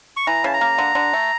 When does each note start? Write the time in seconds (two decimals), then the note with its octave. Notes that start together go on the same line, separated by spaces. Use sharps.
0.17 C#6
0.27 E3 A#5
0.44 C#3 A5
0.53 A#5
0.61 A#3
0.78 D3
0.95 D3
1.13 A3